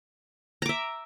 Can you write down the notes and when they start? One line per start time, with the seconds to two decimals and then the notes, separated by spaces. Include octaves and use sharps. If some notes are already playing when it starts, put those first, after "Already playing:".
0.62 A#5
0.66 D6
0.69 E5